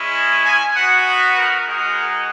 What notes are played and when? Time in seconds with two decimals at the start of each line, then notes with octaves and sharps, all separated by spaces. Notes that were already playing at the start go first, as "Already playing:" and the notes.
Already playing: G#3 C#4 E4
0.45 G#5
0.76 B3 D#4 F#4 F#5
1.38 A#4
1.69 G#3 D#4 F#4 A#4